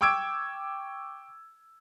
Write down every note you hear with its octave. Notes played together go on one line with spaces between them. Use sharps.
G5 C#6 D6 E6 G#6 D7